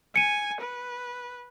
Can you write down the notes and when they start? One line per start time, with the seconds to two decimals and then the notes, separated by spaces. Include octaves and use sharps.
0.16 G#5 C#7 D#7
0.61 B4